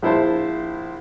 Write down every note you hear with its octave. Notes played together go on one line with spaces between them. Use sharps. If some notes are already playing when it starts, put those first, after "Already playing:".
A#1 E4 C5 A5